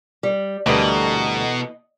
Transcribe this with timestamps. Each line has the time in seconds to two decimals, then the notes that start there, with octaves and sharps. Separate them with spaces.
0.23 G3
0.66 D2 B2 E3 G3 A4 A#4 D#5